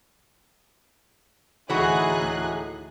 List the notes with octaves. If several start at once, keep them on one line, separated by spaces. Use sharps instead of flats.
D2 A2 E3 D#4 F#4 G#4 F#6